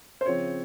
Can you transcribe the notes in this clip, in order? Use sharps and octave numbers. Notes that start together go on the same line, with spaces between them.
C5
C#3 F3 C4 C#5